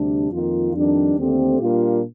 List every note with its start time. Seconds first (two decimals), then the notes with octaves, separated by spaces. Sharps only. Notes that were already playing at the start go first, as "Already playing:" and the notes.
Already playing: D2 C3 G3 D4
0.30 F2 D#3 A#3 F4
0.72 F2 D#3 G3 D4
1.16 D#2 D3 A3 C4 G4
1.59 A#2 G3 A#3 D4 F4